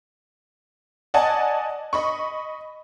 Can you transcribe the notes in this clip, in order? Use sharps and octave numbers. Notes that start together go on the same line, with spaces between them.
D5 D#5 F#5 G#5 A5
D#5 B5 C#6